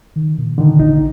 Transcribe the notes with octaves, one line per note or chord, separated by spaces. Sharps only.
D#3
A#2
D3 D#3
A1 D#4